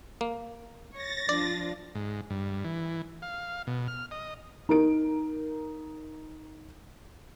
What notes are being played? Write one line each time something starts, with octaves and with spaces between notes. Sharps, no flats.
A#3
C#5 A6 A#6
F3 D4 F4 D5
G#2
G2
E3
F5
B2
F6
D#5
D#4 A#4 D7